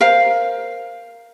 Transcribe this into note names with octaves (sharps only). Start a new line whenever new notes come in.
A#4 C5 F5